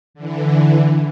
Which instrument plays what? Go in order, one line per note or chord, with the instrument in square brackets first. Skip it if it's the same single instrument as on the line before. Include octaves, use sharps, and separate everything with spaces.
[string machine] D3 E3